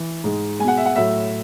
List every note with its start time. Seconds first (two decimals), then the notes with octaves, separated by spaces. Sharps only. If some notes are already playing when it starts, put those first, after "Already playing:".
Already playing: E3
0.24 G#2 G#3
0.59 G#3 G#5
0.64 B2 F#5
0.78 E5
0.86 F#5
0.96 A2 F#3 A3 E5